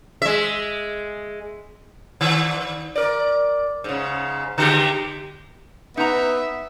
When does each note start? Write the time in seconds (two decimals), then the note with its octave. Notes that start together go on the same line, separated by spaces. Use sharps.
0.22 G#3 E5
2.21 D#3
2.96 A#4 D5
3.84 G#2 C#3
4.58 D3 G#3 G4
5.97 B3 D#4 E5 A#5